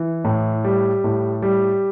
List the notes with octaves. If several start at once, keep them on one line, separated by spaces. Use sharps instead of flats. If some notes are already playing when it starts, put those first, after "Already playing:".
Already playing: E3
A2
G3
A2
G3